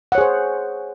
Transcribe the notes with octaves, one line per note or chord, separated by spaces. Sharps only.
G#4 C5 C#5 F#5